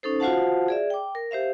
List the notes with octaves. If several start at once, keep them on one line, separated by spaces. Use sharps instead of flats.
C#4 D#4 A4 C5
F4 F#4 C5 F5 F#5 A5
G#4 D5 E5
G5 D6
A#4
G4 C5 E5 F5